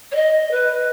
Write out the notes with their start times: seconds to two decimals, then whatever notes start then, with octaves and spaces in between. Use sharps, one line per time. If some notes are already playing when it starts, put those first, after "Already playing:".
0.11 C#5
0.15 D#5
0.51 B4